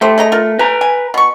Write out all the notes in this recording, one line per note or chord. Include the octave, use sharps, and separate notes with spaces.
A3 E4 G4 C5
G#4 D#5 A#5
F4 A#4
B4 G#5 A#5
G#5
B2 C#6